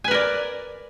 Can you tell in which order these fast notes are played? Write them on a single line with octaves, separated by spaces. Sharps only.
G#5 B4 A#4 D5